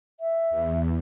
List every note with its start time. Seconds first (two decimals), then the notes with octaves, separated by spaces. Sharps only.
0.20 E5
0.50 E2